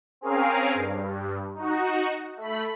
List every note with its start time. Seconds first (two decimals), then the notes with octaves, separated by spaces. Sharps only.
0.21 C4 C#4 G#4 A#4 F5
0.74 G2
1.54 D#4 F#4
2.37 A3 B5